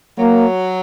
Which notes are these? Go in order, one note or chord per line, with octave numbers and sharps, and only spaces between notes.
F#3 A#3